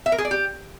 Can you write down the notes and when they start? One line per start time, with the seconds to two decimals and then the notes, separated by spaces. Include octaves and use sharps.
0.06 E5
0.12 A#4
0.18 G#4
0.25 D5
0.31 G4